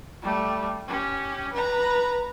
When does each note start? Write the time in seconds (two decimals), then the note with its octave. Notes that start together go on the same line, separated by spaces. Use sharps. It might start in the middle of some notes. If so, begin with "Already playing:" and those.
0.22 G3 A3
0.87 C#4 G4
1.52 B4 A#5